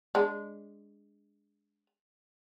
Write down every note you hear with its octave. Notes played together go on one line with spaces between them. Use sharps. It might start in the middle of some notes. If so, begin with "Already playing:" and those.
G#3 D4